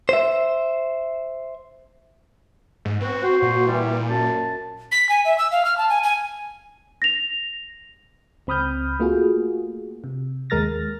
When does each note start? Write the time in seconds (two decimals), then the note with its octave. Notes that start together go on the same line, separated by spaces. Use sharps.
0.09 C5 E5
2.85 G#2
3.01 B3 C4 F#4
3.23 F#4 C5
3.42 A#2
3.66 E3 G3
4.09 F#2 A5
4.92 B6
5.09 G#5
5.25 E5
5.38 E6
5.51 F5
5.65 F6
5.78 A5
5.89 G#5
6.03 G#5
7.02 A#6 F7
8.47 C#2 C4 B5 D#6 F6 G6
9.00 A3 A#3 F4 F#4 G#4
10.04 C3
10.50 D#2 G#3 A#4 F6 A6 A#6